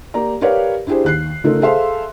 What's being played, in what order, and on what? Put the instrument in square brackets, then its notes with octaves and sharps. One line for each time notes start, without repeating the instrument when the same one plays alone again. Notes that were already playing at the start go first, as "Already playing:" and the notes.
[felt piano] A#3 G4 D5 A#5
G4 A#4 B4 C#5 D5 F5
D4 E4 G4 G#4 C5
D#2 F#6 C7
C#3 A3 D#4 F4 A4 A#4
G#4 A4 C5 E5 F5 C6